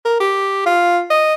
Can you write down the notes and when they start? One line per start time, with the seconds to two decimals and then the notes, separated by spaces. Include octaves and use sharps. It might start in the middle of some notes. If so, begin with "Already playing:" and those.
0.05 A#4
0.20 G4
0.66 F4
1.10 D#5